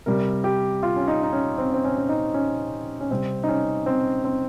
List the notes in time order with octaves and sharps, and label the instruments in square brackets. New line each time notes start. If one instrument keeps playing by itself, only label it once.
[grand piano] C3 G3 A#4
G4
F4
C#4
D#4
D#4
C#4
C4
C4
C#4
C#4
D#4
C#4
C#4
C3 G3 C4
D#4
C#4
C4
C4